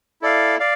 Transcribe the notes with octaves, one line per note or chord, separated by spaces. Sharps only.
E4 A4 D5 F5
D5 F5